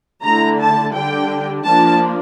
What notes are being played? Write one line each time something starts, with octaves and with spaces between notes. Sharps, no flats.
D3 A3 E4 A#5
A5
D3 G3 D4 G5
F3 A#3 D4 A5